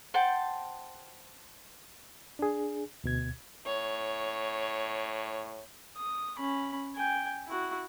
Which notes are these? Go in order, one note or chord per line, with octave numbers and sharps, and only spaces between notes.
C5 F#5 G5 A5
D4 G#4
D2 B2 G#6
A2 C#5
D#6
C#4 B5
G5 G#5
E4 F#4